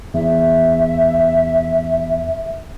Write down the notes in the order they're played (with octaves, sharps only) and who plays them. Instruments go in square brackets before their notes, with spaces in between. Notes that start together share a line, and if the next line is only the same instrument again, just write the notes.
[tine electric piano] E2 [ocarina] E5